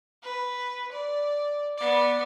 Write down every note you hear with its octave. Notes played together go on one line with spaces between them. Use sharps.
B4
D5
B3 D5